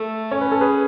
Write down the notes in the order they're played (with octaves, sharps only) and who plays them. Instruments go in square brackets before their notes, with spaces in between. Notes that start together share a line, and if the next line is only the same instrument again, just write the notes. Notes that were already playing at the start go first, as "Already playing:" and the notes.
Already playing: [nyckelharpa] A3
[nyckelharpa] C#4 [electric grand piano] C#5
[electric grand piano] B4
A4
G#4 B4